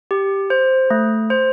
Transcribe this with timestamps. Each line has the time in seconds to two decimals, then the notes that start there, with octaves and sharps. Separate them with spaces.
0.11 G4
0.50 C5
0.90 A3
1.30 C5